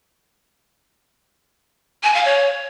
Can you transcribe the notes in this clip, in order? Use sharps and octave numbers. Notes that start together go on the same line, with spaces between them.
G#5
F5
C#5